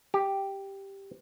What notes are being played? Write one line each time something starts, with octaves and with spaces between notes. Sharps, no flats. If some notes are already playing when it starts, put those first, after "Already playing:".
G4